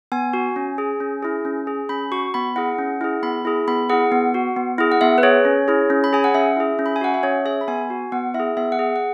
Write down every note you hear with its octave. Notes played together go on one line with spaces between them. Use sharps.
B3 G#5
F#4
C#4
G#4
C#4
E4 G#4
C#4
G#4
C#4 B5
F#4 C#6
B3 B5
E4 G#4 F#5
C#4
E4 G#4
B3 B5
E4 G#4
B3 B5
E4 G#4 F#5
B3
F#4
B3
E4 G#4
F#5
B3 E5
B4
G#4 C#5
C#4
E4 G#4
C#4
B5
G#4 G#5
F#5
C#4 E5
E4 G#4
C#4
B5
G#5
F#4 F#5
E5
C#4 C#5
G#4 E5
B5
B3 G#5
F#4
B3 F#5
E4 E5
G#4
B3 E5
F#5
G#4
F#5